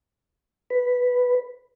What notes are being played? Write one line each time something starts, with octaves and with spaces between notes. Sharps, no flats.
B4